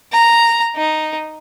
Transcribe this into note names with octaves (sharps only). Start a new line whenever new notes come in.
A#5
D#4